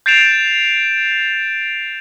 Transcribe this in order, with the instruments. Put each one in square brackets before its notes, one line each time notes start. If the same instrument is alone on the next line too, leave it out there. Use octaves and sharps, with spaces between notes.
[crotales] G6 A6 C7 D7 E7 F7